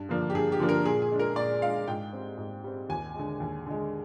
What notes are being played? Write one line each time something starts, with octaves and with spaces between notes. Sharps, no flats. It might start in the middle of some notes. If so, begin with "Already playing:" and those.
Already playing: G2
D3 F3 A#3 D4
G4
G2 G#4
G4
D3 F3 A#3 D4
A#4
A#2 G#4
G#4
G#3 D4
A#4
A#2 D5
G#3 D4 F5
G#2 G5
G3 C4
G#2
G3 C4
D#2 G#5
D3 G#3
D#2
D3 G#3